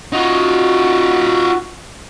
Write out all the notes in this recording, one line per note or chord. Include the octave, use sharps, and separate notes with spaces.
D#4 F4 F#4